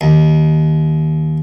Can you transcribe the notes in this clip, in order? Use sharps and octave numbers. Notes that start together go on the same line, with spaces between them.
D#2